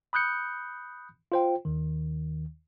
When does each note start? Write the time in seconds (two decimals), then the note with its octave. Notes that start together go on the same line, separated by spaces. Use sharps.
0.13 B5 D#6 F#6 G6 C#7
1.32 F4 C5 G5
1.65 D#2 D#3